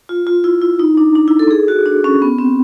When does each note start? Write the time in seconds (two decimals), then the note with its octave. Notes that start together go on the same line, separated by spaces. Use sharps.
0.09 F4
0.27 F4
0.44 E4
0.62 E4
0.79 D#4
0.97 D4
1.15 D4
1.28 E4
1.39 A4
1.51 G#4
1.68 F#4
1.86 D4
2.04 C#4
2.22 B3
2.39 C4